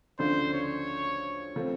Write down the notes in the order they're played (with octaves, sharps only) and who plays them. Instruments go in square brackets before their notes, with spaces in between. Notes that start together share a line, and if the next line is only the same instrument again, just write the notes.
[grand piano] D2 C#3 F3 A3 D4 [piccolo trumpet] C5
[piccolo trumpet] C#5
[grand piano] F3 A3 C4